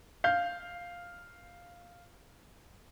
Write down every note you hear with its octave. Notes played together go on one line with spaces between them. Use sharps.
F5 G6